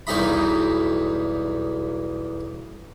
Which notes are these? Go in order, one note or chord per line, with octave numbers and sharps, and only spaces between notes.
B1 E2 G3 D#4 D#5 B5